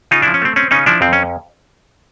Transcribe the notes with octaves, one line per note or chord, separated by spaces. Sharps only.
C#3 D#4 F4
F3 D4 E4
C#4
A3 C4
C4 C#4
C#3 C#4 D#4
F3 D4 E4
F2 C4
C#4